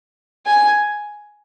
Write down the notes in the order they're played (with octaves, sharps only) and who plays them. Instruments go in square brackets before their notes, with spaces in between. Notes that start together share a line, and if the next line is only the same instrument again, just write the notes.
[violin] G#5